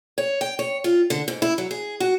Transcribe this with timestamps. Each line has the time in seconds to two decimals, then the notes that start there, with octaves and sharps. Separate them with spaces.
0.18 C#5
0.41 G5
0.59 C#5
0.84 F4
1.10 D3
1.28 G#2
1.42 E4
1.58 F#3
1.71 G#4
2.00 F#4